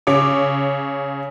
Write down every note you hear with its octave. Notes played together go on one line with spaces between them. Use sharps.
C#3 C#5 D6